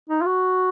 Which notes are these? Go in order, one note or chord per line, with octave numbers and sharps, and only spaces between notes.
D#4
F4
F#4